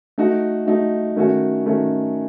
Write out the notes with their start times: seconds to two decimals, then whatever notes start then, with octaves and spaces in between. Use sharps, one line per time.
0.18 A3 D#4 F#4
0.66 A3 D#4 F#4
1.16 D#3 A3 C#4 F#4
1.65 D#3 A3 C#4 F#4